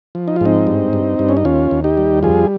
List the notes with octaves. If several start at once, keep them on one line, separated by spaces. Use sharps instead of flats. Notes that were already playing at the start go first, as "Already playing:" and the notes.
F3
D#4
F4
G#2 C4 D#4
G2
G2
G2
C#4
D#4
D#2 C#4 F4
D#2
D#4 G4
G3
F2 F4 G#4